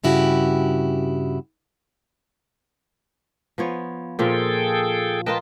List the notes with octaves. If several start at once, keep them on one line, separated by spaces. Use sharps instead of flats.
G2 C#3 E4 F#4 G4
F3 B3 C#5
A#2 F3 G#4 A4 G5
F4 A#4 B4 D#5 G5 A5